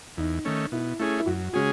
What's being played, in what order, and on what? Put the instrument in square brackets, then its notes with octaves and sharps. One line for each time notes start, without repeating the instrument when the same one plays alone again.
[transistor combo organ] E2 [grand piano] D#4
[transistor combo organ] D#3 A3 C#4
[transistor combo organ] B2 [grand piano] E4
[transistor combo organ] A3 C#4 G#4 [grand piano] E4
[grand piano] E4
[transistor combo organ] F#2 [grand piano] F#4
[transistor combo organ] C#3 G#3 C#4 G#4 [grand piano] F#4